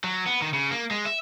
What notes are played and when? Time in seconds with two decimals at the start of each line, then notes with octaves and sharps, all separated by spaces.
0.04 F#3
0.26 B3
0.42 D#3
0.54 C#3
0.71 A#3
0.91 G#3
1.05 E5